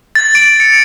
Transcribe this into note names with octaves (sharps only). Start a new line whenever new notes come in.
A6
D7
C#7